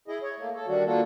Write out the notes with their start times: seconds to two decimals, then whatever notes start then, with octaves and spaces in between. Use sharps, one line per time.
0.08 E4 G#4 D#5
0.23 C#5
0.39 A3 A#3
0.54 A4
0.68 D#3 G3 D4 F#4
0.86 A#3 D4 F4 F#4 A4